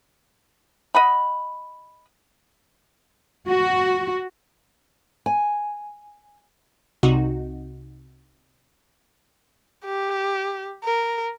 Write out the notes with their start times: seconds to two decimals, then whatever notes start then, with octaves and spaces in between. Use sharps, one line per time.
0.95 D#5 F#5 B5
3.49 F#4
5.26 G#5
7.03 C2 C3 D#4 F#4
9.85 G4
10.84 A#4